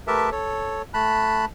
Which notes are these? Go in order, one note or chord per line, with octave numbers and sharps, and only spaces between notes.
A3 G4 A#4 B4 E5 A5
A4 C#5
A3 A5 B5 F#6